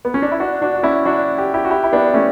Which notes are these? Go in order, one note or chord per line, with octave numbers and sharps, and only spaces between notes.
B3
C#4
D4
E4
D4 F#4
D4 F#4
F#4
C#4 E4
D4 F#4
G4
E4 G4
F#4
E4 G4
E4
B3 D4
A3 C#4